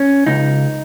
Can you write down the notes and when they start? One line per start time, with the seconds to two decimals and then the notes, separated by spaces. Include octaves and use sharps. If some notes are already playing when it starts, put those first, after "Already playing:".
Already playing: C#4
0.27 C#2 D#4